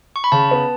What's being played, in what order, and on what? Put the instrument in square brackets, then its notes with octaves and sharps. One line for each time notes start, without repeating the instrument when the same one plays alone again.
[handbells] C#6
B5
[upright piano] C#3 [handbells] A5
[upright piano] B3